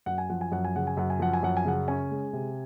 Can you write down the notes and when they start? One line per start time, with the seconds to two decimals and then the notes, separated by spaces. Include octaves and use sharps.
0.06 F#2 F#5
0.18 G#5
0.30 F3 F#5
0.41 G#5
0.52 F#2 F#5
0.65 G#5
0.75 C#3 F#5
0.87 G#5
0.97 F#2 F#5
1.10 G#5
1.19 F3 F#5
1.33 G#5
1.43 F#2 F#5
1.57 G#5
1.65 C#3 F#5
1.88 C#4 G#5
2.11 G#3
2.33 C3